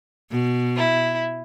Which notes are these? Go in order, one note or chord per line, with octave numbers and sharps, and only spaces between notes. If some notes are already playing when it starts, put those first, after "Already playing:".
B2
E4